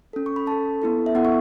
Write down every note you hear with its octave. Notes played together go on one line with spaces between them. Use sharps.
C#4 A4
C#6
B5
C#4 A4 A5
B3 E4 A4
E5
B3 E4 A4 F#5
C#6